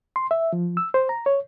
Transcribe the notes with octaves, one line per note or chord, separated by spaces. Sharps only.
C6
E5
F3
E6
C5
A#5
C#5